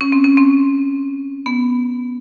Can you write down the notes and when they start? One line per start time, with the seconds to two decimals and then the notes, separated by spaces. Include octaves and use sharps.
0.01 C#4
0.12 C4
0.24 C#4
0.37 C4
1.46 B3